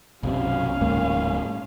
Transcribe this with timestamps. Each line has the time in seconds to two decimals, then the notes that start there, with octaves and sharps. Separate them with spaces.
0.23 B1 F#2 C3 C#4 F5
0.81 D1 G#2 A#3